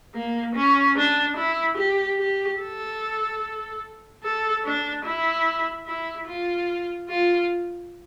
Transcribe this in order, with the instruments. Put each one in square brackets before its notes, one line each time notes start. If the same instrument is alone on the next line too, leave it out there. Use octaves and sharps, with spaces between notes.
[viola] A#3
C#4
D4
E4
G4
G4
A4
A4
D4
E4
E4
F4
F4